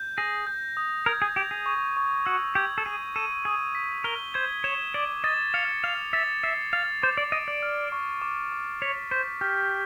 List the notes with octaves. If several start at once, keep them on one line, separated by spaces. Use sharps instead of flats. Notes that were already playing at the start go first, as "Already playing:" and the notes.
Already playing: G6
G#4 A#6
G6
D#6
A#4 G#6
G#4
G4 F7
G#4
C#6
C#6
F#4 E6
G4 G#6
A4
G#4 D#7
A4 D#7
G#4 D#6
B6
A#4 G7
C5 G#6
C#5 E7
D5 D6
D#5 A6
F5 C#7
F5 F7
E5 A6
E5 C7
F5 A6
C5 D6
D5
D#5 D7
D5
F6
C#6
D6
D6
C#5 B6
C5 B6
G4 F6